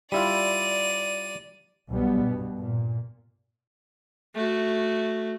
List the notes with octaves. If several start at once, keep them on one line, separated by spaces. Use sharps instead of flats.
G3 E4 F4 D5 D#7
B1 B2 G3 B3
G2 B2
A#2
A3 F#4